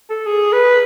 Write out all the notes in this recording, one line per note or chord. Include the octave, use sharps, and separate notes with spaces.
A4
G#4
B4